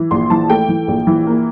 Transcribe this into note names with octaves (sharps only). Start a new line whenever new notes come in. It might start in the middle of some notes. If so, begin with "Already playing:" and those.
Already playing: E3
A#1 C6
E3 A5
A3 G5
E3
A#1
E3
A#3